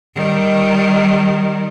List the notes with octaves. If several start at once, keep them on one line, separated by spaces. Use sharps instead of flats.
D#3 G3